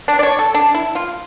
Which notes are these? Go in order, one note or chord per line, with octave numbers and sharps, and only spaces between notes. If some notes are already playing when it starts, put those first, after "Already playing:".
D4
D5
C#5
A4
D4
E4
F4